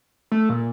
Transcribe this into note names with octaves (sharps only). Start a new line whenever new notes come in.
A3
A#2